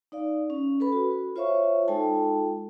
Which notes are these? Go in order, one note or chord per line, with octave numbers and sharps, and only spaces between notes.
D#4 D5 F5
C#4
A4 B4 B5
F#4
F4 C5 C#5 E5 F5 C#6
G#3 D#4 F4 A4 G5 A5